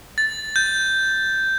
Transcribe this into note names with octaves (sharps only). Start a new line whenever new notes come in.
A6
G6